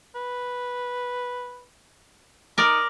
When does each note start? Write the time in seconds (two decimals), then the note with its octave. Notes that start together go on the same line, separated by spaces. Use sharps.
0.15 B4
2.58 D#4 A#4 D5